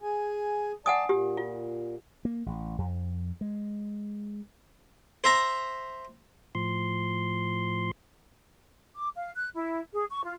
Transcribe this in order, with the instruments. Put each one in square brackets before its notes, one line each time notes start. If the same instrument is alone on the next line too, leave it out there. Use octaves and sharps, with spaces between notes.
[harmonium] G#4 G#5
[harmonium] D5 A5 [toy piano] F#5 G#5 D#6
[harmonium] A#2 [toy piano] G4
[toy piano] F4
[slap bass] A#3
A1
F2
G#3
[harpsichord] C5 E5 A#5
[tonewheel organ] A2 F3 C6
[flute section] D6
F5
F#6
E4
G#4
C#6
F4